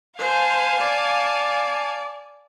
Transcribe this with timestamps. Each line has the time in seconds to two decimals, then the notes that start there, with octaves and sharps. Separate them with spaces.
0.19 C5 F5 G#5 A5
0.80 D5